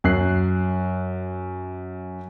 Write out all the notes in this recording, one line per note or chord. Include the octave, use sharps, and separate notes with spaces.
F#2 F#6 C7